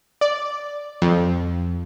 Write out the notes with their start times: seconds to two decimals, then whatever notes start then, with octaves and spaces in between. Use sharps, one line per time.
0.21 D5
1.02 F2